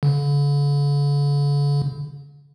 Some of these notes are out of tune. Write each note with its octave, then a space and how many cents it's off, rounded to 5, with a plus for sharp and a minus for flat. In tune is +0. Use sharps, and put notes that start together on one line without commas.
D3 -45